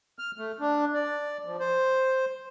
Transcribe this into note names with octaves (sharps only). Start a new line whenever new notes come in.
F6
A3
D4
D5
F3
C5